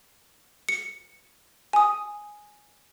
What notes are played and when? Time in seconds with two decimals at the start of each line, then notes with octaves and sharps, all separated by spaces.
0.69 C#7
1.73 G#5 D#6